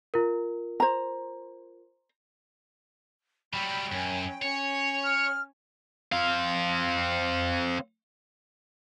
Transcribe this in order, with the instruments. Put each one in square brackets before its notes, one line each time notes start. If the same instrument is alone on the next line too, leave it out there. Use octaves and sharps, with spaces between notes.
[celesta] F4 A#4
[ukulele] C5 A#5
[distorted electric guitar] F#3 G3 [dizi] G5 [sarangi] B5
[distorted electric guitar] F#2 [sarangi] C#4
[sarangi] C#4 [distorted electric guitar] C#5
[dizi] F6
[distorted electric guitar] C4 F5